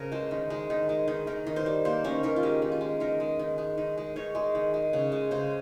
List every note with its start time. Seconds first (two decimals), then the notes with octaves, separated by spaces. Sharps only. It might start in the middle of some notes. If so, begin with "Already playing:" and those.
Already playing: C#3 F3 A#4
0.12 G#3 C5
0.31 D#3
0.50 G#3
0.70 D#3
0.89 G#3
1.08 D#3
1.27 D#3 A#4
1.47 D#3
1.56 C5
1.66 G3
1.85 A#3 C5
2.04 D#3 C#4
2.23 D#3 A#4
2.36 F4
2.43 G#3 G4
2.62 D#3
2.72 F4
2.81 G#3
3.00 D#3 A#4
3.20 G#3
3.39 D#3
3.58 G#3
3.78 D#3
3.97 G#3
4.16 D#3 C#5
4.35 G#3
4.55 D#3
4.74 G#3
4.93 C#3
5.12 G#3
5.31 C#3 C5